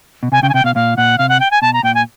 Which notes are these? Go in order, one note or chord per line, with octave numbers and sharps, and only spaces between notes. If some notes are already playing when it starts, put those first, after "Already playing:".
B2
C3 G#5
C#3 G5
G#5
C3 G5
B2 F5
A#2 F5
A#2 F#5
C3 F5
F#5
G5
G#5
B2 A5
A#5
A#2 G5
G#5